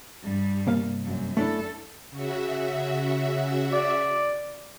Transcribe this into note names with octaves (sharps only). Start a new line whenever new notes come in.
G2 G3
C2 A#3 F5
F#2
A3 D4 E4 A4
C#3 F#4 E5
D5